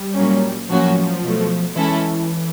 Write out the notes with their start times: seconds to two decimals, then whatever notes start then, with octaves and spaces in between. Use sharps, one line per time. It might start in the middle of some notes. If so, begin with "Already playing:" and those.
Already playing: G3
0.15 A#2 F#3 A#3 C#4
0.69 A2 F3 F#3 A#3 C#4 F#4
1.22 B2 F#3 A3
1.76 E3 G#3 C#4 E4 A4